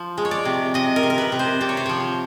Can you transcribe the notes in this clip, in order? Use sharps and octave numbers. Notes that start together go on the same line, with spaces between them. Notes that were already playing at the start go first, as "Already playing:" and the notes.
Already playing: F3
G#3
C#5
D5
C3
C3 D#5
A#4
C3
A#4
B4
C3
C5
C3 D5
C#5
C5
F3 C#5